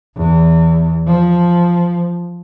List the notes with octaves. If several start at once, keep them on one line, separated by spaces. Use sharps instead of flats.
E2
F3